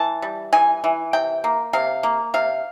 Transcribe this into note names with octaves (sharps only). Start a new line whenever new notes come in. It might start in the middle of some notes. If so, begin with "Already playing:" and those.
Already playing: E3 A5
G3
E3 G#5
E3
C3 G5
A#3
C3 F5
A#3
C3 F5